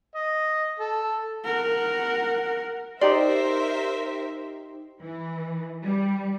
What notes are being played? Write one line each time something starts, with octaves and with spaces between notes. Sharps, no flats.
D#5
A4
A#4 F#5
D#4 G4 A#4 C5 D5 E5 C6
E3
G3